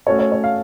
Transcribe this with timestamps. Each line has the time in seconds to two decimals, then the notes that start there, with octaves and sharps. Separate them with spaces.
0.06 A3 C#4 F#4 A4 C#5
0.19 C#5
0.32 C#5
0.44 F5